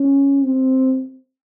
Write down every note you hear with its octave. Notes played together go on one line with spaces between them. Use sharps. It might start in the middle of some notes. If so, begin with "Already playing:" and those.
Already playing: C#4
C4